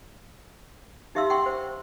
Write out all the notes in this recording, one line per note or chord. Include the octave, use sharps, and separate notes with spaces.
D#4 G4 E5 F5 C6 E6
F#5 G5 C6 C#6
C5